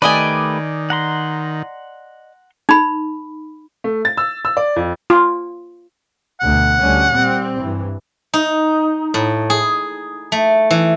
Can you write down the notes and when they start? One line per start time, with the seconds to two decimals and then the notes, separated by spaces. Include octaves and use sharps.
0.02 D#3 A3 G4 B4 D5 D#5 G#5
0.90 F#5 A#5 C6
2.69 D#4 B5
3.84 A3
4.05 A6
4.17 E6
4.45 E6
4.57 D5
4.76 F2
5.10 F4
6.41 D2 B2 F#5
6.79 D2 G3 C#4
7.11 A#2 G3 C4
7.60 G2 E3
8.34 D#4
9.14 A2
9.50 G#4
10.32 A3
10.71 E3